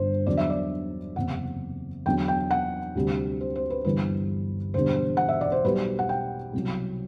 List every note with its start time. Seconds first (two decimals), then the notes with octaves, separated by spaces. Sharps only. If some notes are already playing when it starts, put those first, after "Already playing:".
Already playing: G1 G2 C5
0.26 E2 D3 F#3 D5
0.37 E5
0.50 D5
1.16 F#1 E2 C3 F#5
2.06 E2 D3 F#3 G5
2.28 G5
2.51 F#5
2.95 D2 C3 G3
3.41 C5
3.56 C5
3.70 B4
3.85 G1 G2 E3 G3 B4
4.74 E1 E2 D3 G3 C5
5.17 F#5
5.29 E5
5.41 D5
5.52 C5
5.64 B1 B2 G3 B4
5.99 F#5
6.09 G5
6.53 C2 B2 F#3